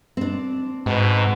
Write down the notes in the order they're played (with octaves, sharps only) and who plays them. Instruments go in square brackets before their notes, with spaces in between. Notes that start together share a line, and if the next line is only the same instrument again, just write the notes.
[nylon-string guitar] C4 D4
[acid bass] G#2 [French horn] B2